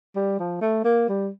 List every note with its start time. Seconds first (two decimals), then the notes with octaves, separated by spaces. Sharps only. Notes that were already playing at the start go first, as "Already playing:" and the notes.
0.16 G3
0.39 F3
0.61 A3
0.84 A#3
1.08 G3